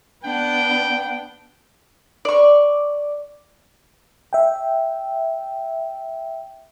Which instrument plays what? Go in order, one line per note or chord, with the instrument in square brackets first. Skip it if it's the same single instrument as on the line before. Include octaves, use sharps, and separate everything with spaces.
[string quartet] B3 D4 F#5 [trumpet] G5
[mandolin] D5 C#6
[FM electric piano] E5 G5